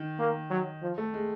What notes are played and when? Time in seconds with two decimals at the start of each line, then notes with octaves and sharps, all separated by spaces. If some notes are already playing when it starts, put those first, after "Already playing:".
Already playing: D#3
0.19 A#3
0.50 F#3
0.82 F3
0.98 A3
1.14 G#3